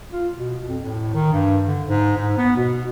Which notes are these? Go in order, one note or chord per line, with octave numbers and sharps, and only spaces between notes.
F4
B2
F2
A2
D#3
G2
D3
G#2
G#2
B3
B2